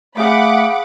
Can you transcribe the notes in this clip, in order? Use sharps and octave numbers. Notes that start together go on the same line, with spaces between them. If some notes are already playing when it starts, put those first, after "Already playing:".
A3 G#4 F5 F#5 B5 D6